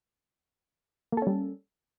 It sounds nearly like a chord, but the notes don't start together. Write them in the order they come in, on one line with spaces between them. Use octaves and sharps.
A#3 A4 C#4 G3